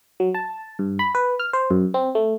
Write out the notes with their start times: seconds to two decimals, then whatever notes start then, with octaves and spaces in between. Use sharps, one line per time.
0.20 F#3
0.35 A5
0.79 G2
0.99 B5
1.15 B4
1.40 F6
1.53 C5
1.70 F#2
1.94 C4
2.15 A3